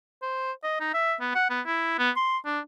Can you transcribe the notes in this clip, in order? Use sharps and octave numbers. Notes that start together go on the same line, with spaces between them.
C5
D#5
D#4
E5
B3
F#5
B3
E4
B3
C6
D4